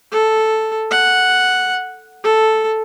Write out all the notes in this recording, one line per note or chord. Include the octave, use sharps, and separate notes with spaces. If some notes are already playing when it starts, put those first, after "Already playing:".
A4
F#5
A4